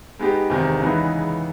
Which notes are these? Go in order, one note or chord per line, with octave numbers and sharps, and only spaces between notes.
G#3 B3 D#4 G4
E2 C3 D#3
C#3 E3 G#3 B3 D#4